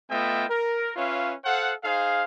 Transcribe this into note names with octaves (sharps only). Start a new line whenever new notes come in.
A3 B3 F4 D#5 E5 G5
A#4
C#4 F4 B4 C#5 E5 F5
A4 C5 F5 F#5
D#4 G#4 C5 F5